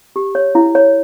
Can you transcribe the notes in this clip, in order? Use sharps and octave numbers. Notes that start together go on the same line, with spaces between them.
G4
C#5
E4
C#5